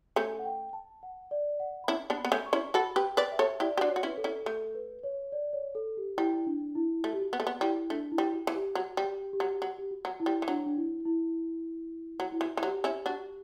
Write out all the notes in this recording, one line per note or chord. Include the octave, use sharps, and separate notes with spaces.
A3 C#4 A4
F#5
G5
A5
F#5
D5
F#5
B5
C#4 E4 A5
B3 D4 A5
B5
B3
A3 C#4
C#6
C#4 E4
F#4 A4 B5
G4 B4
G5
B4 D5
E5
A4 C#5
E4 G4 D5
G4
D4 F#4
C#5
F#4
C#4 E4
B4
A4
C#4 E4
A3 A4
B4
C#5
D5
C#5
A4
G4
G3 E4
D4
E4
A3 F#4
G4
F#4
B3 F#4
A3
B3
G3 E4
A3 D4
E4
G3
F#4
E3
G4
F#3 F#4
G3
G4
G4
F#3
F#3
G4
F#4
F#3
E4
G3
E3
F#3 D4
D4
E4
E4
F#3 F#4
E4
E3
F#4
E3
F#3 G4
C#4 E4
D4 F#4